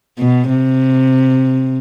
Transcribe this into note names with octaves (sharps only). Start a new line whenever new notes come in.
B2
C3